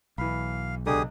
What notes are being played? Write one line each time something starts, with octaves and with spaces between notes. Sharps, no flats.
B1 E3 F5 B5
C#2 D3 G4 G#4 D#6